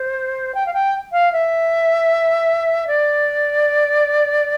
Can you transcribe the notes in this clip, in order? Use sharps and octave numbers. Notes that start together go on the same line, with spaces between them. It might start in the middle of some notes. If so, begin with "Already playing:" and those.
Already playing: C5
G5
F5
G5
F5
E5
D5